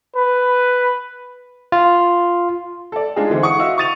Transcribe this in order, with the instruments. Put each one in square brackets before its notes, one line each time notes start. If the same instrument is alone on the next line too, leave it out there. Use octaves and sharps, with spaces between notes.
[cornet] B4
[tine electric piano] F4
[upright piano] A4 D5
G#3 D4 D#4 F4 G#4
D3 E3 C4 D#4
F#5 C#6 D#6 C#7
E4 F#4 D#5 F5 E6
C#6 D#6 A6 D#7 F7